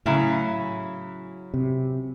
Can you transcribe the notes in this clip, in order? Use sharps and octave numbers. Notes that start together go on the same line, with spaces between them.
A2 C#3 F#3 C#4 E4
C3